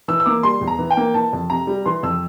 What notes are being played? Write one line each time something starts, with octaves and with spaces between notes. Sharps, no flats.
E3 E6
E6
A#3 D6
G3 C6
E2
A#5
E3
G5
A#3
E3 A5
F2
C3 A#5
G3
E3 C6
F2 E6